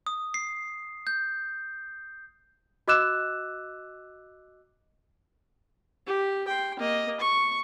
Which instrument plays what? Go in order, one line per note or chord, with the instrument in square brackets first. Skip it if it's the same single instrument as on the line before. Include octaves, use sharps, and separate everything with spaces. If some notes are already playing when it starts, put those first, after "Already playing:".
[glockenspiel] D#6
C7
G6
[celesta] F#4 D#5 D6 E6 F#6 E7
[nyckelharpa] G4
G5 C6
A#3 D#5
C#6